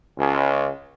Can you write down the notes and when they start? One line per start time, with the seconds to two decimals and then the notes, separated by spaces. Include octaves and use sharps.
0.18 C#2